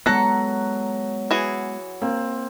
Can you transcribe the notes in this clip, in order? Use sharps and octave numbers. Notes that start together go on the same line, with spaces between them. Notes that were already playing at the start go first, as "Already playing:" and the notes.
F#3 G#3 B3 A4 F#5 F#6 A#6
E3 F#4 G#4
A#3 C4